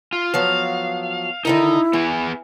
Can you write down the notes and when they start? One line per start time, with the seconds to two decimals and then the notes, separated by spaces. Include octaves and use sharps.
0.13 F4
0.34 F3 F#3 B3 F5
1.45 D3 D#3 D#4 E4 A#4
1.93 E3 B3 G#4